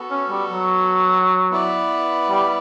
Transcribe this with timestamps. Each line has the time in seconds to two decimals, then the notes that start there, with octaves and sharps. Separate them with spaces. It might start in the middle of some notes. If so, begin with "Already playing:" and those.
Already playing: B3 F#4 A4
0.10 C#4
0.30 G3
0.51 F#3
1.51 B3 E4 B4 D5
2.30 G3